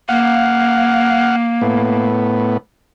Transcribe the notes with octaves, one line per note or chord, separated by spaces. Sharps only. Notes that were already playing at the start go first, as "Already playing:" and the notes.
A#3 F5 F#5
A2 B3